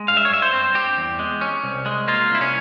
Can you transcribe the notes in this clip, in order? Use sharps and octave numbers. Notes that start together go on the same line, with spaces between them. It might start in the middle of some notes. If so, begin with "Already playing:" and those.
Already playing: G#3
G2 F5
E5
C#5
G2 E5
C5
C4
C4 G4
E2
G#3
C#4
C2
G#3
A#3 F4
C2 E4
C#4